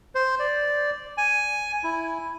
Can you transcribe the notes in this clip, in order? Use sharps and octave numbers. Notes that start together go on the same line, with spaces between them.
C5
D5
G#5
E4